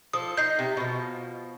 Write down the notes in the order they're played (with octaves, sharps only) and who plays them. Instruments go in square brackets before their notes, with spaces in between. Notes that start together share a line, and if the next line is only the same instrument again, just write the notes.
[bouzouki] F3 A4 [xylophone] D#6
[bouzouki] D#4 [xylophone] G6 C7
[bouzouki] C3
B2 F3